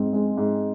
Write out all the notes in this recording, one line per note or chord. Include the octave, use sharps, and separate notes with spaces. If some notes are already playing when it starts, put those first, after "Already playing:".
Already playing: G#2 C4
G#3
G#2